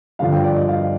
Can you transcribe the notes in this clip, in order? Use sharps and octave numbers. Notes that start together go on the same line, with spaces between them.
G2 D3 F3 F5
G5
D5
D#5
F5